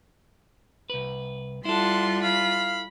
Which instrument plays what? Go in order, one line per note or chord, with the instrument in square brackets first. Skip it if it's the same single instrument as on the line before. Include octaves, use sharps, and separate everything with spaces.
[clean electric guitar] C2 B4
[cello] G3 F4 [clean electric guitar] E4 A4 [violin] F#5 C6
[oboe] F5 [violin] B5